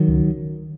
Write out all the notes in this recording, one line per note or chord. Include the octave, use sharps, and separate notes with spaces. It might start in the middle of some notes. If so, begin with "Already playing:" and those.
Already playing: D#3 F#3
C#2